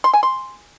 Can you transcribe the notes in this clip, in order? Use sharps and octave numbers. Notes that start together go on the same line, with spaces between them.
C6
G#5
C6